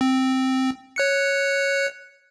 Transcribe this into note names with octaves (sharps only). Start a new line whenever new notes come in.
C4
C#5 F#6 C#7